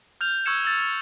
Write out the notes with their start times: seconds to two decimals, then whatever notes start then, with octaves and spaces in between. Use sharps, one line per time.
0.21 F6 G6 F7
0.46 C#6 E6 F6 G#6 C#7 E7
0.65 E6 A6